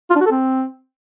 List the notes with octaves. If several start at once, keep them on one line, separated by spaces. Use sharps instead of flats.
F4
D4
F#4
A4
C4